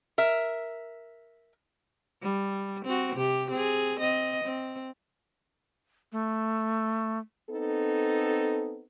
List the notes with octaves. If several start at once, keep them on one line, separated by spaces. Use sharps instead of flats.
A#4 E5
G3
C4 F#4
C3 G4
C4 G#4
C4 D#5
C4
A3
B3 C4 D#4 A4